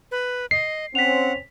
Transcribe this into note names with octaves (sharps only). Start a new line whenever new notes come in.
B4
D#5 C7
C4 C#4 F#5 B6 F7